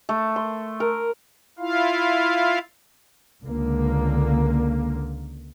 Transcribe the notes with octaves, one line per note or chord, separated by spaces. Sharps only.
A3
C6
A#4
E4 F4 F5
C#2 D3 A#3